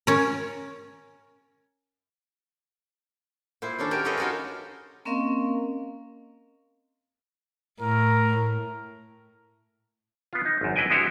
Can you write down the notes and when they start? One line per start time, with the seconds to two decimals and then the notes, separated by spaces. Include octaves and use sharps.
0.07 C#4 A#4
3.62 A#2 E4 C5
3.79 D#3 C#4 D4 A4
3.91 F#4 G4 A#4 G5 G#5
4.05 C#4 F4 A4 B4 C#5 D#5
4.17 D#4 F4 F#4 A4 A#4
5.05 A#3 C4 C#4 A#4 D#5 F5
7.81 A2 A#4
10.33 B3 F4
10.45 D#4
10.61 G#1 F#2
10.76 D4 E4 B4 D#5 G5 G#5
10.90 G#3 B3 D4 E4 F#4 G4